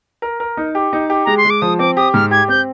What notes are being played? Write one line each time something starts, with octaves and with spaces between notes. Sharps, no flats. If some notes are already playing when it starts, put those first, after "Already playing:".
A#4
A#4
D#4
G4
D#4
G4
G#3 A#5
C6
G#3
D6
F3 D#6
C4 D6
G4 D#6
G#2 F6
G4 G#6
C4 G6